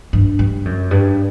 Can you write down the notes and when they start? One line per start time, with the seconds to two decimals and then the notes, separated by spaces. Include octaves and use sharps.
0.13 G2
0.39 G2
0.65 F#2
0.91 G2